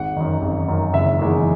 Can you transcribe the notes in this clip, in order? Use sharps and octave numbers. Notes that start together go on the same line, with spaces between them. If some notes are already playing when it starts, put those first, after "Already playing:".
Already playing: G#1 F#5
F#2 D#3
G#1
F#2 D#3
F#1 E5
E2 D#3 G#3